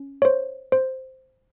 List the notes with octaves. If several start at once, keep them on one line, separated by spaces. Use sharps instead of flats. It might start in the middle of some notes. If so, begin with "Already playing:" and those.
Already playing: C#4
C#5
C5
C5